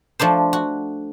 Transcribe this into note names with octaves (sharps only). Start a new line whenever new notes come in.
F3 A3 D4 C5
F#4